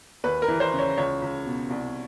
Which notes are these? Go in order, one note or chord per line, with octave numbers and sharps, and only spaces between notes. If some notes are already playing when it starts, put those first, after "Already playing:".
D#2 B4
A#4
E3
C5
C#3
C#5
C#2 C#5
C#2
B2
C2